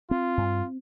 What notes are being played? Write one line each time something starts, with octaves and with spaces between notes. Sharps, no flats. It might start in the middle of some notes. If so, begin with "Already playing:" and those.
C4 F4
G2